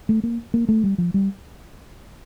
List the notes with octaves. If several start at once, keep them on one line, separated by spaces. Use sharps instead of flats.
A3
A#3
A#3
A3
G3
F3
G3